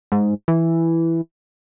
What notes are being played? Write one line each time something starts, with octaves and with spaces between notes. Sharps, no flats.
G#2
E3